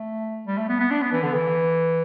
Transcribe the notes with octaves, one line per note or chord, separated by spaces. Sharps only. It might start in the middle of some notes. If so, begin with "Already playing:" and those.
Already playing: A3
G3
A3
B3
B3
D4
B3
E3
D3
E3